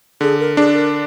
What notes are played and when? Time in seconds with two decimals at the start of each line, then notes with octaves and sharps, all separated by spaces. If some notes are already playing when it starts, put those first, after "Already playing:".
0.21 D3 G#4
0.40 A#4
0.57 D4 G#4
0.74 A#4